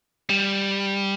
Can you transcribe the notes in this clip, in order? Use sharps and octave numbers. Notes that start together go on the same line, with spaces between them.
G3